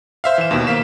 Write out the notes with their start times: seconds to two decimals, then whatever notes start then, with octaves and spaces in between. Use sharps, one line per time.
0.24 C5 E5 F5
0.38 E3 E7
0.51 D#2 B2
0.67 A#3 F5 B6 E7